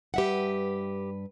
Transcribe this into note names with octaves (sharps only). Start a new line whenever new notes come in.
G2 G4 B4 E5 F#5